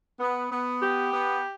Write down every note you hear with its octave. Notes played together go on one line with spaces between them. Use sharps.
B3
B3
G4
B3